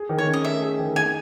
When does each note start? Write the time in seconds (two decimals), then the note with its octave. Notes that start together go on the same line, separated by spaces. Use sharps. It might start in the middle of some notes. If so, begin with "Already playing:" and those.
Already playing: G#4
0.09 D#3
0.18 C#5
0.27 C#4
0.33 D#5
0.44 A3 E5
0.62 G#4
0.79 D#3
0.96 D#4 G#5